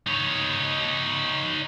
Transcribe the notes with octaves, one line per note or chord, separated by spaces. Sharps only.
D#4 C#5